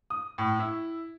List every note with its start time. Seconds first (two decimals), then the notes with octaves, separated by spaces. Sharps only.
0.10 D#6
0.38 A2
0.59 E4